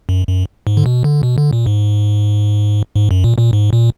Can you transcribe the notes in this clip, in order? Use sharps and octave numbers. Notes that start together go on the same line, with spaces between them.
F#2
F#2
G#2
D3
B2
D3
B2
D3
A#2
G#2
G#2
F#2
A#2
A#2
G#2
A#2